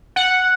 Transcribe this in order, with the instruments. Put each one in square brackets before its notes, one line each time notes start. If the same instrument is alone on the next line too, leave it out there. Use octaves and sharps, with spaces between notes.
[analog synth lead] F#5